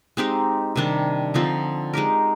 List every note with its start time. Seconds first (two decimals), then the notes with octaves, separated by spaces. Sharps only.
0.17 G#3 C4 D#4 G4
0.76 C3 D#3 G3 D4
1.34 D3 F3 C4 D#4
1.94 G#3 D#4 G4 A#4